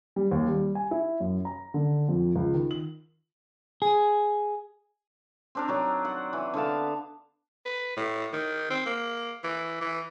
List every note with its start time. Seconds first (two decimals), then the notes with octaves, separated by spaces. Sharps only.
0.16 G3
0.31 D#2
0.47 G3
0.75 G#5
0.91 E4
1.20 F#2
1.45 A#5
1.74 D3
2.09 F2
2.36 C#2
2.54 D#3
2.71 F#7
3.82 G#4
5.55 C4 D4 A#4
5.68 D#3 F#3 D4
6.05 F#5
6.33 E3
6.54 D3 B3 F5 A5
7.65 B4
7.97 A2
8.33 D#3
8.70 C4
8.86 A#3
9.44 E3
9.81 E3